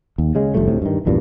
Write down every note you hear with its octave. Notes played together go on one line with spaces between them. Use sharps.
D#2
C#3 G#3
F1 F3 G3 A3
D2 A2 C3
G2 D#3
A#1 E2 G2 A#2